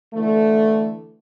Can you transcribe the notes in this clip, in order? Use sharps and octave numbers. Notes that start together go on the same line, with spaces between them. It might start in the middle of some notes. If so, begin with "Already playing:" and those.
D3 E3 A3